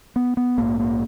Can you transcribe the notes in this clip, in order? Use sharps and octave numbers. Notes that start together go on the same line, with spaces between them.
B3
B3
A#1 G#2 A#3
A#3